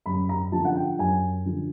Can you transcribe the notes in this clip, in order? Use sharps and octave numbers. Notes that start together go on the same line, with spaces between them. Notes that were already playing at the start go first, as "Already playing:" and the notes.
F#2 B5
A#5
D3 F3 A5
F#5
G5
F#2 G#5
D3 F3